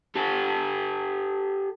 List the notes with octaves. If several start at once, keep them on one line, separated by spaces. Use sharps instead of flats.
G4 A4